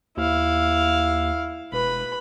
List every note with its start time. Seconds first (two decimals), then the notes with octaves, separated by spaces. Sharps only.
0.17 D#2 E4 F5
1.72 E1 B4 B5